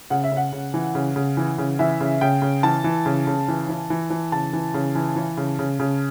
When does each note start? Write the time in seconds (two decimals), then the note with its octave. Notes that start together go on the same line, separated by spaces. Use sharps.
0.10 C#3 F#5
0.24 E5
0.32 C#3 F#5
0.53 C#3
0.74 E3
0.95 C#3
1.16 C#3
1.37 E3
1.58 C#3
1.79 E3 E5
2.01 C#3
2.21 C#3 G5
2.42 C#3
2.63 E3 A5
2.84 E3
3.06 C#3
3.27 C#3
3.48 E3
3.69 E3
3.90 E3
4.10 E3
4.32 C#3 A5
4.53 E3
4.74 C#3
4.95 E3
5.16 E3
5.37 C#3
5.59 C#3
5.80 C#3